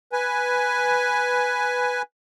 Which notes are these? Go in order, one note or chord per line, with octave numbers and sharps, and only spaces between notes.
B4 G#5